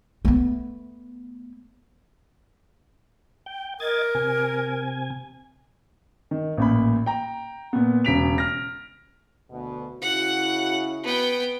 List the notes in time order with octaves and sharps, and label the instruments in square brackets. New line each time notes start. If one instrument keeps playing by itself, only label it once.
[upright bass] A3 B3
[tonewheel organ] G5
[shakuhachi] A#4 [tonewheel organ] D#5 G#6 A6
[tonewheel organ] C3 G#5
[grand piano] D#3
A1 A#2 B5
G5 A#5
A#2 B3
E1 C#3 B6 D7 F7
F6 A#6
[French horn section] D2 B2
[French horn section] C#3 E4 F#4 [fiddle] F#5
[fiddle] B3 G5